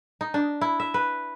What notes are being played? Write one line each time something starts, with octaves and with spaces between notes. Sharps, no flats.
D#4
D4
E4
E5
B4